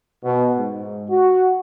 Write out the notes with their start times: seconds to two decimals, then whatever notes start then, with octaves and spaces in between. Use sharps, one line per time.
0.24 B2
0.58 G#2
1.10 F#4